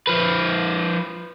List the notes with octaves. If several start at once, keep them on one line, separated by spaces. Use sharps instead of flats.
F3 B4